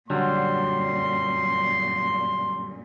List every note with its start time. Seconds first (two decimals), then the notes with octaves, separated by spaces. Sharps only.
0.10 F#2 A#2 D3 F#3 G3 C6